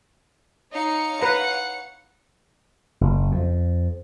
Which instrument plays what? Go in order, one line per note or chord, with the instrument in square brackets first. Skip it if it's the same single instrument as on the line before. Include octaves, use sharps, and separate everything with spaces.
[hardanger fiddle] D#4 [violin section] C#5 F5 C#7
[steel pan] B4 A#5 [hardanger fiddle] F#5
[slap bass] F#1
F2